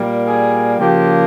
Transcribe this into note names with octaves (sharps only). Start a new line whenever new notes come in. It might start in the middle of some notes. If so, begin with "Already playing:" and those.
Already playing: A#2 G3 A#3
G#4
C#3 F3 A#3 G4